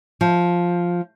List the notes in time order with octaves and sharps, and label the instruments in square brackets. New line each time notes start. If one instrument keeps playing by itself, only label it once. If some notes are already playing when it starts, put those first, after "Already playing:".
[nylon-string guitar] F3